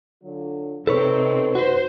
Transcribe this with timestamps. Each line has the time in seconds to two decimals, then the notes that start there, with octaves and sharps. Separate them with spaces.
0.24 D3 F#3 F4
0.87 C3 C4 D#4 A4 B4 C#5
1.55 F#4 B4 C5